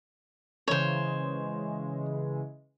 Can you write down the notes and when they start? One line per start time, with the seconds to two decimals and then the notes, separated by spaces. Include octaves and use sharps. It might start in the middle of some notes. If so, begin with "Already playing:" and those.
0.68 C#3 E3 G#3 C5 C#5